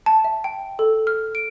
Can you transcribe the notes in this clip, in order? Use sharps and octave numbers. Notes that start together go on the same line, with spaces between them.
A5
E5
G5
A4
F6
D7